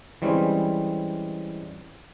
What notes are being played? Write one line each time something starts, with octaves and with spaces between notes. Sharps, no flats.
E3 G3 G#3 C4 C#4